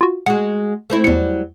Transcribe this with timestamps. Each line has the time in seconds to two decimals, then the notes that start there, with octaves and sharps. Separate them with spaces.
0.01 F4 F#4
0.26 G#3 F#4 F#5
0.90 A3 C4 E4
1.04 E2 F#3 G3 C#7